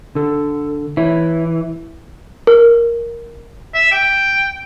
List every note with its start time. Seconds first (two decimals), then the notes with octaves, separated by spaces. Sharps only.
0.15 D3 A4
0.97 E3 E4 C#5
2.47 A#4
3.74 E5
3.92 G5